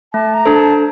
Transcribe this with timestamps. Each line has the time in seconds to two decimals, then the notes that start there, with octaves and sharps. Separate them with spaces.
0.13 A3 A5
0.34 A#5
0.45 D4 A4 C5
0.56 A5